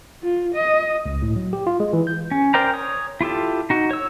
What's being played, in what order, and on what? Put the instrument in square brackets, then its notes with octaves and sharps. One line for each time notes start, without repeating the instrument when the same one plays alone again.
[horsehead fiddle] F4
D#5
[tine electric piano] C#2
A2
F#3
G4
F4
G#3
E3
G6
[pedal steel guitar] C#4
A#4 C5 D5 G5 A#5
C#5 D#6
E4 F4 G4 A4
D#4 F#4
C#5 E6